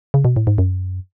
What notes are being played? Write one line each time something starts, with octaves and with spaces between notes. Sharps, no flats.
C#3
B2
A2
G#2
F#2